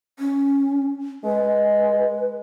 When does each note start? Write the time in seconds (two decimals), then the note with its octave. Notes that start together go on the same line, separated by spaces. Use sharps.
0.19 C#4
1.24 G#3 B4